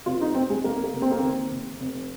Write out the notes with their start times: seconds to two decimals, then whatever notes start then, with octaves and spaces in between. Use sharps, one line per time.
0.06 F1 F4
0.21 D#4
0.35 F1 C4
0.50 G#3
0.64 F1 A#3
0.84 A#3
0.93 F1
1.02 C4
1.11 A#3
1.19 D#2 C4
1.51 F1
1.80 F1